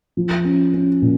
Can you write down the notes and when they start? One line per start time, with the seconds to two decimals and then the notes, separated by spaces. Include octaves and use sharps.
0.17 F3
0.45 C#4
0.74 C#4
1.02 A#2